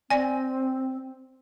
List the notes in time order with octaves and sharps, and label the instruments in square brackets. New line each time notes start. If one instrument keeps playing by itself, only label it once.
[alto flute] C4 [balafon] D5 G#5